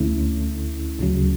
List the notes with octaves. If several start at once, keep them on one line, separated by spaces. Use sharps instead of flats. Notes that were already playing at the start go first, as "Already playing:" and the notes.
Already playing: D2 D3 A3 C#4 E4
D2 C#3 F#3